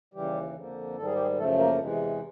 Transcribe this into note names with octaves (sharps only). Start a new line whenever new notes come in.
D#2 C#3 E3 G3 G4
F2 D3 F3 A#3
G#2 D#3 G3 A4
G#4
G4
G#3 G#4
F#2 C#3 F3 A3 A4
A#3 A#4
E2 C3 E3 G#3